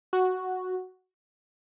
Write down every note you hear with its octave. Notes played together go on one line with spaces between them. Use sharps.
F#4